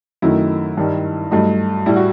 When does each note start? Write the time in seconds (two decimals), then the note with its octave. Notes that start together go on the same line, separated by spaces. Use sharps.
0.22 F#2 D#3 A3 E4
0.77 G2 D#3 G3
1.31 G2 F#3 A3 D#4
1.86 A2 G3 E4
1.96 F#4